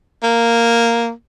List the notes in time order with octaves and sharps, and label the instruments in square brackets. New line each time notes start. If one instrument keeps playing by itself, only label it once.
[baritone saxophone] A#3